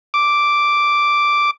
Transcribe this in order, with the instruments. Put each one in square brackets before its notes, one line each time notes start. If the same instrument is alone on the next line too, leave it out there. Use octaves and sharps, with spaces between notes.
[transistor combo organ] D6